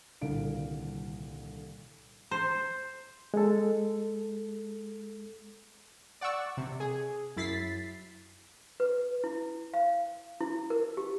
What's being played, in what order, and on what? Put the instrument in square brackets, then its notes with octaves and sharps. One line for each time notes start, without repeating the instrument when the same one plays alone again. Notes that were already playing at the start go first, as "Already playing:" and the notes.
[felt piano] D#1 C2 D3 F5 D7
[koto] C5
[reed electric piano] G#3 A4
[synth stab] D5 F#5 C#6 E6
C3
G#4
F#2 E4 A6 B6 C7
[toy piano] B4
E4
F5
E4
A#4
G4